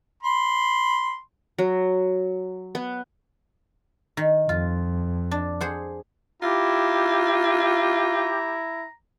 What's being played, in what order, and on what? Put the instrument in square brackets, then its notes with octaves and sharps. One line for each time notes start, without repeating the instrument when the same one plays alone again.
[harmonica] B5 C6
[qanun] F#3
B3
[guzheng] D#3
[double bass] F2 [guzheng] F4
[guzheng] D4
G#4 C5 F#5
[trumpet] E4 [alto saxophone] F4 [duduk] G4 [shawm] A#5